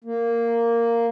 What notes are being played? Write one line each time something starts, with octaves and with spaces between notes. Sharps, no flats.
A#3